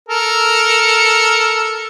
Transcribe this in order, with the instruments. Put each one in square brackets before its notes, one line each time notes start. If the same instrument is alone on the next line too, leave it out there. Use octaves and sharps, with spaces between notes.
[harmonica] A4 A#4